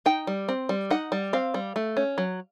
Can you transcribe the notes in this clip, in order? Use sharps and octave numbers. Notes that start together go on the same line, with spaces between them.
D#4 G5
G3
C4
G3
D#4 F#5
G3
C4 F5
G3
A3
C#4
F#3